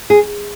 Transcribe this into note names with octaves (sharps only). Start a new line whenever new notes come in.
G#4